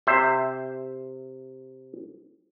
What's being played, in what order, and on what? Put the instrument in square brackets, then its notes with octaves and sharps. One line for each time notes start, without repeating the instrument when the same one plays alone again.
[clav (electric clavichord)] C3 C5 E5